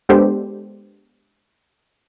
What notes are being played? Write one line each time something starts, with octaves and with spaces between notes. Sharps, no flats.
G#3 B3 D4 G4 A4 C5